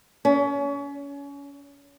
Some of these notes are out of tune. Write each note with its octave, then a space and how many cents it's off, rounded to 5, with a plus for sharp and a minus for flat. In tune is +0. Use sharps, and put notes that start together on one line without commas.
C#4 +30